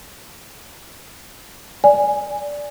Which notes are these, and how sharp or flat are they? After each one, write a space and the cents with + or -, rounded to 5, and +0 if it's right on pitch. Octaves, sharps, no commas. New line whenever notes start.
D5 -10 G#5 +0